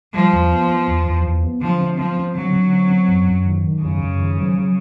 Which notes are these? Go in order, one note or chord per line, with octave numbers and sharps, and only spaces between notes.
F3 G3
E2
B3
B3
E2
E2
E2
B3
D3 F3
C4
F3 C4
C4
D3 F#3
D3
C4
C4
F#2
F#2
D#3
D#3
F#2 C#3
F#2
D#3
F#3
F#3